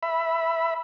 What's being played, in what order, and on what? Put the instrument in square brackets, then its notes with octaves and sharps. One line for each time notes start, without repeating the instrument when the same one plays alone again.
[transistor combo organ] E5 B5